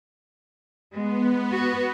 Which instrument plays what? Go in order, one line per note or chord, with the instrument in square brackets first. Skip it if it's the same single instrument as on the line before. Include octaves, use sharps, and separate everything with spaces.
[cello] G#3 [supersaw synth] B3
[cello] F#4